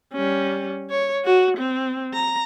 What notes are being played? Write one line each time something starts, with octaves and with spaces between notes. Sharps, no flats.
G3 C#4
C#5
F#4
C4
A#5